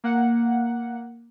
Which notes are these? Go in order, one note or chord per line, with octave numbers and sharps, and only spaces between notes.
A#3 F#5